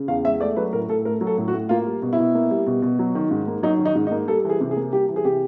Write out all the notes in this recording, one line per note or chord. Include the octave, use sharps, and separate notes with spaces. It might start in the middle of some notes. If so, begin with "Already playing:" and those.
Already playing: C#3
E2 F5
G#3 E5
A3 D5
F#3 B4
A2 A#4
A2 A4
A3 A#4
F#3
A4
A2
F#4
A2
A#3 F4
G3
B2
E4
B2
A#3
G3
B2
B2
F#3
D#3
G#2
A#3
F#3 D#4
D#3
D#4
G#2
D#4
A#3
G3 A4
E3 G#4
C3
G#4
A#3
G3 G4
E3
G#4
C3 G4